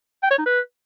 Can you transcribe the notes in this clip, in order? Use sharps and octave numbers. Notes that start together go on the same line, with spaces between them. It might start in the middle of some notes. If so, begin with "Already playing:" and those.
G5
C#5
D#4
B4